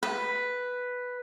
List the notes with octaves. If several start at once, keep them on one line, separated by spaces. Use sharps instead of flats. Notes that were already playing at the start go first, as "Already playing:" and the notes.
B4